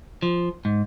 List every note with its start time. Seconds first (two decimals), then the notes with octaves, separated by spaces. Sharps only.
0.22 F3
0.65 G#2